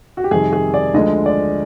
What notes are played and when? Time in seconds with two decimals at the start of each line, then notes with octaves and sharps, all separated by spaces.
0.17 F#4
0.24 G4
0.31 F2 C3 D#3 G3 G#4
0.53 G#4
0.74 D5
0.94 D2 D3 F3 G#3 D#5
1.26 D5